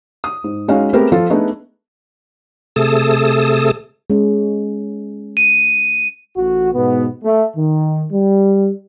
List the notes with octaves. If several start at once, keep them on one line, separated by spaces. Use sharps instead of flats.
D#6
G#2
G#3 C#4 D#4 F#4 G#4 F5
A3 B3 C4 G4 G#4 A#4
F3 F4 A4
A3 B3 D4 D#4 G#4
C3 A3 G#4 A4 A5 D#6
G#3 C#4
D#7
A1 F#4
G#2 B2 B3
A3
D#3
G3